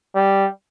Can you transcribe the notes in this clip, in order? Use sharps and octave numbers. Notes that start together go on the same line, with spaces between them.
G3